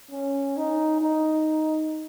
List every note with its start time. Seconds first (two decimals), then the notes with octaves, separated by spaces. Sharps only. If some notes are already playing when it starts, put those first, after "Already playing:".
0.11 C#4
0.57 D#4
1.01 D#4